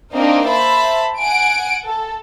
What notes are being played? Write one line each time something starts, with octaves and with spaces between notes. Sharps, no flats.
A#3 C4 D4 D#4 A#4
C5 E5 A5 B5
F#5 G#5 D7
A4